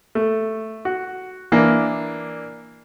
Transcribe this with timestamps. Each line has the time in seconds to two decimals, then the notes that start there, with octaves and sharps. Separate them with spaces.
0.15 A3
0.85 F#4
1.52 E3 A#3 D4